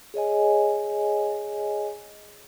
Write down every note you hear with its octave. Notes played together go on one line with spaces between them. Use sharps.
G#4 C#5 D#5 G#5